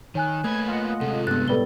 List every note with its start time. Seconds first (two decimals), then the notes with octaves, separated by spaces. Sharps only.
0.15 D#3 C#5 G#5 F#6
0.44 A3 A#3 B4 G#6
0.68 F4 D#5 F#5
1.01 C3 G#3 A4
1.27 G2 B3 F#6 A6
1.48 A2 G3 A4 B4 G7